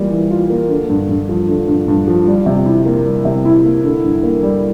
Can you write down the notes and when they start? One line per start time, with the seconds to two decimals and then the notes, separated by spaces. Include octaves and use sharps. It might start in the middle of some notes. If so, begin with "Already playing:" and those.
Already playing: E3 G3 A#3 F4
0.11 E3
0.31 F4
0.50 A#3
0.69 D3
0.90 G2
1.09 G2
1.29 F3
1.48 D3
1.68 G2
1.88 G2
2.07 F3
2.27 G3
2.46 C3
2.66 E4
2.86 A#3
3.05 G3
3.25 C3
3.45 E4
3.65 A#3
3.84 D3
4.04 G2
4.23 A#3
4.43 G3